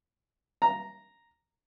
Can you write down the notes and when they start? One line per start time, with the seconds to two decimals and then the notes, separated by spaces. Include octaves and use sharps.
0.62 A#5